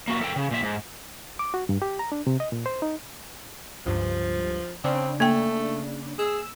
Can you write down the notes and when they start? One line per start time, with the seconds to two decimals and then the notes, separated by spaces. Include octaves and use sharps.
0.08 A#3 F#4 E5
0.22 A4 A#4 G5
0.36 C#3
0.51 A#2 E5
0.63 G#2
1.39 D6
1.54 F#4
1.69 G2
1.82 G4
1.99 A#5
2.12 D4
2.27 C3
2.40 D#5
2.52 A#2
2.66 C5
2.82 D#4
3.86 C#2 G2 F3
4.84 C#3 C4 D4
5.20 A3 A#3 G5
6.19 G#4 E6